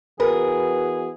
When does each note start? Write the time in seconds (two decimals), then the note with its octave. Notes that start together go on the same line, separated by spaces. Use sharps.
0.20 E3 B3 F#4 G#4 A#4 B4